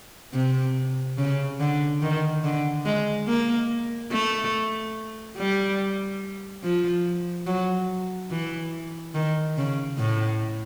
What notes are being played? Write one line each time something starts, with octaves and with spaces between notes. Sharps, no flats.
C3
C#3
D3
D#3
D3
G#3
A#3
A3
G3
F3
F#3
E3
D#3
C#3
A2